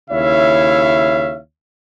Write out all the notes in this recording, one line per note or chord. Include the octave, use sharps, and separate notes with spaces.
D#2 C#3 E4 C#5 E5 F5